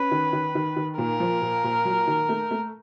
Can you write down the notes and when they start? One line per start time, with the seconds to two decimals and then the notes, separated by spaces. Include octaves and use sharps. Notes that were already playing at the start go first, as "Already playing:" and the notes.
Already playing: C#4 B4
0.11 D#3
0.33 D#3
0.55 D#3
0.76 D#3
0.98 A#2 A#4
1.20 F3
1.42 A#2
1.64 A#2
1.85 F#3
2.07 D#3
2.29 A3
2.51 A3